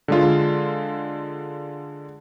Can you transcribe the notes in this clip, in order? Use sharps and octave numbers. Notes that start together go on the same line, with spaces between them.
D3 G#3 F4